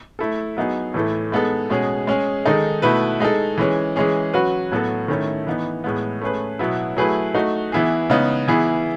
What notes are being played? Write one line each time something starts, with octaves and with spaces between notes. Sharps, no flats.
A3 E4 A4
F#3 B3 D#4 G#4
A2 E3 A3 E4 A4
G#3 B3 D#4 A4
B2 G#3 C#4 G#4
G#3 C#4 G#4
D#3 G#3 D#4 A4
B2 A3 E4 B4
G#3 D#4 A4
E3 G#3 C#4
E3 G#3 C#4 G#4
F#3 C#4 F#4 B4
A2 F#3 B3 F#4 A4
D#3 A3 C#4 E4 A4
E3 B3 D#4
A2 G#3 B3
A3 C#4 G#4 B4
B2 F#3 B3 E4
F#3 A3 E4 G#4 B4
A3 D#4 F#4
E3 B3 E4 G#4
C#3 G#3 B3 D#4
E3 B3 E4 G#4